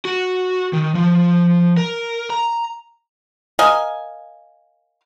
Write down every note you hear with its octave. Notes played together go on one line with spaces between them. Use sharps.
F#4
D#3
F3
A#4
A#5
A#4 D#5 F5 G#5